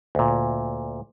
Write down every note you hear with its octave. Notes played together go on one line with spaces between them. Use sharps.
D2 A#2